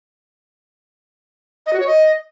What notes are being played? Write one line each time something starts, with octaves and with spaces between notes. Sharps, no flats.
D#5
F#4
C#5
D#5